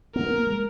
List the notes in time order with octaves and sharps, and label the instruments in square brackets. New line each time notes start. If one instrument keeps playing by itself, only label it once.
[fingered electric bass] B3 [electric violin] A#4
[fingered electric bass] A#3
G#3